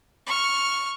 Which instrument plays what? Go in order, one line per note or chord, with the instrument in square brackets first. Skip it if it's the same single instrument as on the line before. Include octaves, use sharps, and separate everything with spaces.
[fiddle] C#6 F6